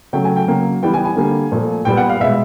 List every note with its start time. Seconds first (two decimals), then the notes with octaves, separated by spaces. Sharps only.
0.13 C#3 F#3 A3 G5
0.24 G#5
0.36 G5
0.48 C#3 F#3 A#3
0.83 E3 G3 B3 G5
0.94 G#5
1.05 G#5
1.16 D3 G3 A#3
1.52 A#2 F3 A3
1.85 A#2 G3 B3 G5
1.97 F#5
2.09 F5
2.20 B2 G#3 B3 E5